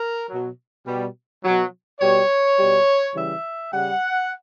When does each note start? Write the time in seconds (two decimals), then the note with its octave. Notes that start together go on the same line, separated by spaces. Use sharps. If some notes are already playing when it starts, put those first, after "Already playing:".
Already playing: A#4
0.29 B2 F#3
0.86 B2 G3
1.44 B2 F#3
2.00 B2 G3 C#5
2.57 B2 G3
3.14 C#3 E3 G3 E5
3.72 C#3 G3 F#5